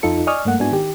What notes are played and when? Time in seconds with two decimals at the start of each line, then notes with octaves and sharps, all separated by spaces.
0.03 F2 D#4 F4 A4 C#7
0.27 D5 D#5 G#5 C#6 D#6 F6
0.45 G2 A3 A#3 F#5
0.59 G#2 B3 D4 E4 F#4 G#5
0.71 D#3 G4